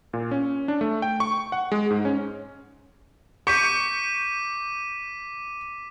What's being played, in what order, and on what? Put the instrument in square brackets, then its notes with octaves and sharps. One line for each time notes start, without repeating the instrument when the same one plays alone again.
[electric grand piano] A#2
C#4
D4
A3
G5
C#6
F#5
G#3
G#2
C#4
[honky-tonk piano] C#6 G6 C#7 [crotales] D6 B6 D#7